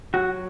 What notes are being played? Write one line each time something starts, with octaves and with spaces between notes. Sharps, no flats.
F#3 F#4